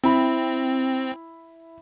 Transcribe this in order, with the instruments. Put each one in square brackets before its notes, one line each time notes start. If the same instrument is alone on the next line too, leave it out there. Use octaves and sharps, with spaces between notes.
[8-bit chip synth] C4 [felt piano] E4 B5